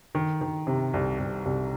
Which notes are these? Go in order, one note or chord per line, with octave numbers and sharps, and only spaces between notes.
D#3
D#3
C3
C2
C2
C2